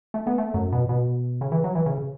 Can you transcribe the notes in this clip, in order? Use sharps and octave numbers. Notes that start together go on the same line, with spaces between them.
A3
B3
A3
F#2
B2
B2
C#3
E3
F#3
E3
C#3